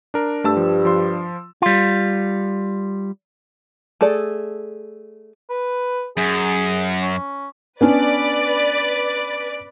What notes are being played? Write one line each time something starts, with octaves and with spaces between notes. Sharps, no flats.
D4 A#4
G2 A3 A5 E6
F3
F3 C6
G3 F4
A3 G#4 A4 D5
B4
F#2 G#4
C#4
B3 C#4 D4 B4 D5